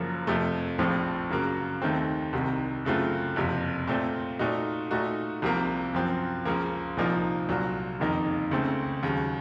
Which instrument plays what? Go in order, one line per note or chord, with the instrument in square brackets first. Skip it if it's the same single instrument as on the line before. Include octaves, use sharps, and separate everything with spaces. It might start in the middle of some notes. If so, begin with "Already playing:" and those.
Already playing: [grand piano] F#1 F#2 F3 A#3
F2 C3 F3 A3
A#1 A2 F3 C4 F4
F#2 C#3 F#3 A#3
D#2 D#3 A3 C4
C2 C3 D#3
F#2 C#3 A3 C4 F4
F#1 F2 C3
A#2 A3 C4
A#2 A3 D#4 F#4
A#2 A3 D#4 F#4
C2 C3 F3 A#3
F#2 F3 C4
C#2 C#3 F3 A#3
C2 A#2 F3 A#3 D#4
C2 A#2 F#3
F#1 F2 D#3 A#3 D#4
C#2 C#3 A3 C4
D#2 C#3 F#3